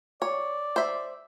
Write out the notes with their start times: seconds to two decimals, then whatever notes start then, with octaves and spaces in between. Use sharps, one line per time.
0.22 C#5 D5
0.76 C5 E5